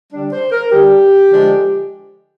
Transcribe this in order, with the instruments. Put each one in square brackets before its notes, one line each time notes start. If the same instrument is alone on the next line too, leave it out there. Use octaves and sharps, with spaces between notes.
[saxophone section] D3 G3 D4
C5
A#4
D3 G3 D4 G4
D3 F3 G#3 D4